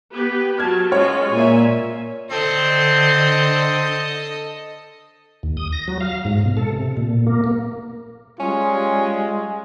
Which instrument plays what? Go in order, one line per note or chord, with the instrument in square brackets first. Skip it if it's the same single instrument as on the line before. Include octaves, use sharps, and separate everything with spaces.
[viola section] B3 G4 B4
[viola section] F#3 A5 [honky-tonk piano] F6 G#6
[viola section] G#3 C#4 F4 [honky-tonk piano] C#5
[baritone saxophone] A#2 [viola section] E5 G#5
[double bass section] D3 [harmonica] C4 [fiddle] A4 D#5
[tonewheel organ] D#2
D#6
A#6
F#3
F5
G#2
B2
A4
C3
A#2
A#3
A#3
[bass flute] G3 [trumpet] G#3 [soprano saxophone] C#4 [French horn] F4